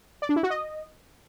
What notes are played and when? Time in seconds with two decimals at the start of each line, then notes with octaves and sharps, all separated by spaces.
0.22 D5
0.29 D4
0.36 E4
0.43 F#4
0.50 D#5